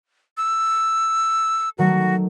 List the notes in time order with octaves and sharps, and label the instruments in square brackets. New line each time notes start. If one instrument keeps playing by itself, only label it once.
[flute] E6
[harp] D#3 F#3 A3 [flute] F#4